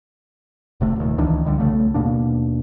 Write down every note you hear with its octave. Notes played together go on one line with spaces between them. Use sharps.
E1 C3 A3
D#1 D#2
C#2 D#3 E3 D4
C#2 D3 G3
B1 F2 C#3 A3
D#2 B2 A#3 D4